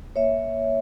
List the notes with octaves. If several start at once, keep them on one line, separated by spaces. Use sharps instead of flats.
A#3 C#5 E5